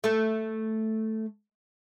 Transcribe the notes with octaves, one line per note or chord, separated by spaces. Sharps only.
A3 A4